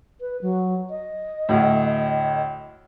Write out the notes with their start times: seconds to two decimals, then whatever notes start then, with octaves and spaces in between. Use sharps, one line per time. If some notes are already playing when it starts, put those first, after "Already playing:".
0.21 B4
0.42 F#3
0.90 D#5
1.49 D2 A2